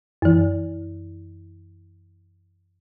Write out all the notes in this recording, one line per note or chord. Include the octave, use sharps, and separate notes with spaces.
F#2 E3